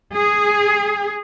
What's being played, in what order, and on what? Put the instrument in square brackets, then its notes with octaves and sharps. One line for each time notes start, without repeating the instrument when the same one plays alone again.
[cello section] G#4